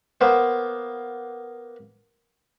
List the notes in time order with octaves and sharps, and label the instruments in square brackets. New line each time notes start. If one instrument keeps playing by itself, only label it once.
[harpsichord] A#3 B3 C5